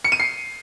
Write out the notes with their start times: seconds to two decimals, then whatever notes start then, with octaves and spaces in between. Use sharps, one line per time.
0.04 C#7
0.12 D#7
0.20 C7